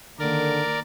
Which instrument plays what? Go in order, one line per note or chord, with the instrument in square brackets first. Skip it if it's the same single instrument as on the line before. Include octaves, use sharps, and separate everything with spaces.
[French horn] D3 [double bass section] D#3 A#3 [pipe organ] A#4 D5